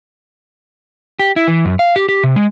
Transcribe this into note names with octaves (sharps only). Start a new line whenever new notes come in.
G4
E4
E3
F#2
F5
G4
G4
C3
G#3